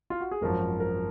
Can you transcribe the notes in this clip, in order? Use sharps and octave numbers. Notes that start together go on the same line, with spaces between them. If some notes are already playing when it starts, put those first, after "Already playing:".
F4
F#4
G#4
G#1 F#2 F3 A#4
A#4